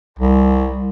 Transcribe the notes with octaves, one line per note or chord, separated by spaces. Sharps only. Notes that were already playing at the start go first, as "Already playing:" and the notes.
C2